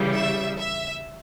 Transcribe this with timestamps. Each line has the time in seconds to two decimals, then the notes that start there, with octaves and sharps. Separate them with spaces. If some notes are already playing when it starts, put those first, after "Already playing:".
Already playing: C#3 E3 G3
0.13 E5
0.58 E5